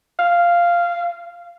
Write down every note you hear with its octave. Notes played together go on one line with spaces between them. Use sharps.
F5